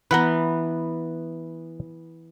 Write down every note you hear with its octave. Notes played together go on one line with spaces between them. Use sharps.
E3 B3 B4 F#5 A#5